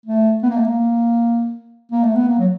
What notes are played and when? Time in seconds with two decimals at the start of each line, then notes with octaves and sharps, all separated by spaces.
0.06 A3
0.43 B3
0.50 A#3
0.57 A3
0.64 A#3
1.92 A#3
2.03 A3
2.15 B3
2.28 A#3
2.39 F#3